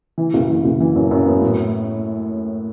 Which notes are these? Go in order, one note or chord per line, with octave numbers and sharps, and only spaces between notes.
E3
F#1
E3
F#1
E3
F#2
F#2
B3
A2